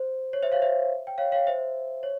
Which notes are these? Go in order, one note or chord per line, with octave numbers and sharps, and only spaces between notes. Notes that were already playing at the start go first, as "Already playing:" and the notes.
Already playing: C5
C#5
C5 E5
C#5 F5
C5 E5
G5
C#5 F5
C#5 F5
C5 E5
C#5